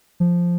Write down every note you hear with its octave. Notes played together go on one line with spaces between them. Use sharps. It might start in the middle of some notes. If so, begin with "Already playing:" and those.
F3